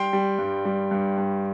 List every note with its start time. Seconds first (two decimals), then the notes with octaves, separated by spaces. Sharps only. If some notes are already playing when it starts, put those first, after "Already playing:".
Already playing: G3 G5 C6
0.13 G3
0.39 G2
0.65 G3
0.91 G2
1.18 G2